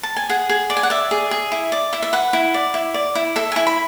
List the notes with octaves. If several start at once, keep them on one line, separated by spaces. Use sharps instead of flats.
A5
G#5
G#4 F#5
G#4
D5
G#5
F#5
D5 E5
G#4
G#4
E4
D5
E4
E5
B4 F#5
E4
D5
E4
D5
E4
A4 E5
E4 G#5
B5